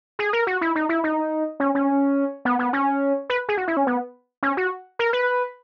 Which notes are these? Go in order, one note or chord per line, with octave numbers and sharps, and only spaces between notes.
G#4
A#4
F#4
E4
D#4
E4
D#4
C#4
C#4
B3
B3
C#4
B4
G#4
F#4
E4
C#4
B3
C#4
F#4
A#4
B4